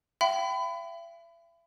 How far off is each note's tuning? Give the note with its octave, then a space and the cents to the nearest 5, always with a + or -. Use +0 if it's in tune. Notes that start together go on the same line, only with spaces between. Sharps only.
E5 +40 G5 -30 B5 +30